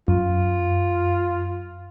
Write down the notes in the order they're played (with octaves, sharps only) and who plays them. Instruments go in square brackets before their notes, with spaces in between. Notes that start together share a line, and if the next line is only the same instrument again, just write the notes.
[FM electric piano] F#2 [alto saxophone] F4